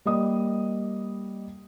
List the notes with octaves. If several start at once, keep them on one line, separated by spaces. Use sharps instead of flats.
G3 A#3 D#5 D#6